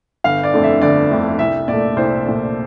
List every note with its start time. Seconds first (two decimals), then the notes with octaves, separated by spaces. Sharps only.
0.24 G1 F5
0.44 D5
0.53 F2 D3 A3
0.63 E5
0.82 G1 D5
1.11 F2 D3 A3
1.39 C2 E5
1.68 A#2 A3 D5
1.96 C2 C5
2.26 A#2 A3